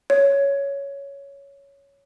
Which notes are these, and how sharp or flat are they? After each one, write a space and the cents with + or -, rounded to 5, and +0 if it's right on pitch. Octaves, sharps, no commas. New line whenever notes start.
C#5 +10